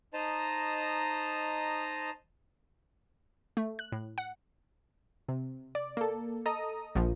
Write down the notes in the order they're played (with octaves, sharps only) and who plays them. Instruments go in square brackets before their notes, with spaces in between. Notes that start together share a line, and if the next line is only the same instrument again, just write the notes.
[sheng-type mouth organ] D#4 C5 D#5 A5 A#5
[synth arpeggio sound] A3
F#6
A2
F#5
[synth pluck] C3
D5
A#3 A4
A4 D#5 A#5 D#6
A#1 A#2 F3